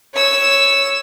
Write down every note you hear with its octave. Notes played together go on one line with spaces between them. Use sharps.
C#5 E6